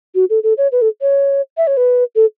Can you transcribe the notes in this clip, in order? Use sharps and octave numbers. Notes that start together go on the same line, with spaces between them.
F#4
A4
A4
C#5
B4
A4
C#5
E5
C#5
B4
A4